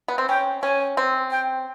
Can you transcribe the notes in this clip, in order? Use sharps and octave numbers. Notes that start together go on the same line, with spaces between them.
B3
C4
C#4 G5
C#4 G#5
C4
G5